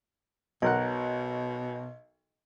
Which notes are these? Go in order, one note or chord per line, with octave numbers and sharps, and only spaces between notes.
B1 B2 A#4 D#5 F#5